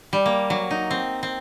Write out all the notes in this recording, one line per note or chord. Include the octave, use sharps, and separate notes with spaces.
G3
A#3
F#3
D#4
C4
C4